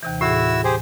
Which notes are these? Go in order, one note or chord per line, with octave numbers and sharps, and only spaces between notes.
D#2 C3 E3
A2 E4 F#4 G#4 E6
G4 G#4 C5